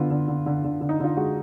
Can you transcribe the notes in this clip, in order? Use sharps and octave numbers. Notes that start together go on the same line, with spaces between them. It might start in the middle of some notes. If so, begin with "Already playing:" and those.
Already playing: D3 B3 F4
D3
D3
D3
D3
D3
D#4
D3 F4
G#3 F#4